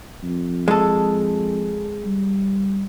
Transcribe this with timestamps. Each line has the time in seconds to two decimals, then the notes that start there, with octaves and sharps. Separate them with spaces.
0.23 F2
0.68 G#3 A4
2.05 G3